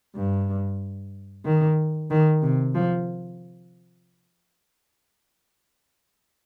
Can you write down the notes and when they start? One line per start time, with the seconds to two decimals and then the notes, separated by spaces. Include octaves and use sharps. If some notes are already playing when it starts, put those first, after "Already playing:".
0.16 G2
1.45 D#3
2.11 D#3
2.42 C3
2.75 F3